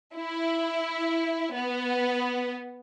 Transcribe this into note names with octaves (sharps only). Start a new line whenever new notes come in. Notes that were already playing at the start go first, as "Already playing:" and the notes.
E4
B3